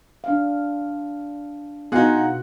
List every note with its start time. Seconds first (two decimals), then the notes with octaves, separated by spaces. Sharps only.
0.24 D4 F5
1.92 B2 D#4 F4 F#4 G#4 F#5